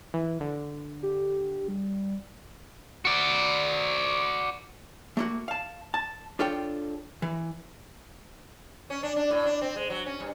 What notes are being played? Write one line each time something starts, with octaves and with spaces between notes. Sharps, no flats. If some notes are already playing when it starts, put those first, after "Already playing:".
E3
D3
G4
G3
F#4 D5
A3 A#3 F#4
F5 A5
A5
D4 F4 A4 C#5 G5
E3
C#4
D4
D4
A2
D4
C4
G#3
F#3
C#4
G2